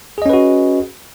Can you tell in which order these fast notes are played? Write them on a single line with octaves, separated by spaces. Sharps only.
G#4 D#5 C#4 B4 F#4